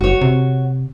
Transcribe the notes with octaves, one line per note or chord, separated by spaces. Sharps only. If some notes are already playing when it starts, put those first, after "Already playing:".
F#1 F#4 C#5
C3